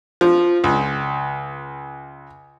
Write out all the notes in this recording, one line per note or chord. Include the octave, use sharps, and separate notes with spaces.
F3
C#2